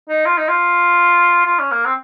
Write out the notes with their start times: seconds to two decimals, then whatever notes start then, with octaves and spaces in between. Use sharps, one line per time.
0.09 D#4
0.26 F4
0.38 D#4
0.49 F4
1.46 F4
1.59 C#4
1.72 A#3
1.85 C4